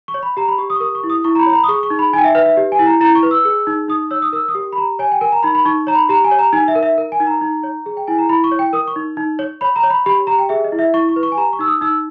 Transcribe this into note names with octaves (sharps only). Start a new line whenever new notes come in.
C#6
C#5
B5
G4 A#5
B5
G4 C#6
D#6
C#6
A#4 D#6
C#6
E4
D#6
E4 C#6
A#5
B5
C#5 A#5
B5
D#6
G#4 C#6
C#6
D#4
B5
D#4 G5 G#5
E5
B4 E5
E5
G4
G#5
E4
A#5
E4 A#5
C#6
B4
E6
G#4
D#4
D#4 D#6
C#5 E6
D#6
A#4 E6
D#6
G4
B5
G4 A#5
C#5 G#5
G5
A#4 G#5
A#5
D#4 B5
B5
D#4 C#6
C#5 A#5
B5
G4 A#5
G#5
C#5
A#5
D#4 G#5
E5
A#4
E5
A#4
G#5
D#4
A#5
D#4
C#5
G#4
G5
E4 G#5
A#5
E4 B5
C#6
C#5
G5
A#4 D#6
C#6
D#4
D#4
C#5
C#5 B5
A#5
C#5
B5
G4 B5
G4 A#5
G5
G#4 E5
D#5
E4
E5
E4 C#6
C#6
B4
C#6
G#5
G4 A#5
C#6
D#4 E6
D#6
D#4 E6